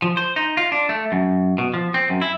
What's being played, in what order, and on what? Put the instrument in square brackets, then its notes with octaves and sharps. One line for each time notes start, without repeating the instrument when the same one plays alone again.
[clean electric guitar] F3
C5
D#4
F4
D4
A3
F#2
B2
F3
C4
F#2
E4